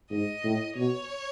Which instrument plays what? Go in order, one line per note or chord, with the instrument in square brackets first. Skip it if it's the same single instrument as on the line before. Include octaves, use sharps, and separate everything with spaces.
[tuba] G#2 [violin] D#5
[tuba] A2
[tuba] B2 [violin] C#5